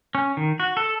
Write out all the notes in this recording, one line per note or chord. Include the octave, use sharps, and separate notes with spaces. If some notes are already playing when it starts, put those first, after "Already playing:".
C#4
D#3
F#4
A4